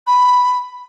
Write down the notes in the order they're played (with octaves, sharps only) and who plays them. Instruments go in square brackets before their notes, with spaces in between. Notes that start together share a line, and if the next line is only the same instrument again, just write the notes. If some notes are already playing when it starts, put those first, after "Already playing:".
[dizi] B5